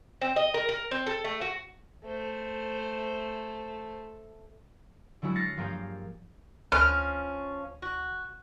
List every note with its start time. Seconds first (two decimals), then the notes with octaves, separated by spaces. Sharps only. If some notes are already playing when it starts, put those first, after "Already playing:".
0.21 C4
0.36 D#5
0.54 A#4
0.69 A#4
0.91 C4
1.07 A4
1.24 A3
1.41 F#4
2.04 A3 C5
5.22 D3 F#3 G#3 E4 F#4
5.36 F6 F#6 A6 A#6 C7 C#7
5.57 G2 F3 A#3 G4 G#4 F5
6.72 D2 F3 C#4 F6
7.82 F#4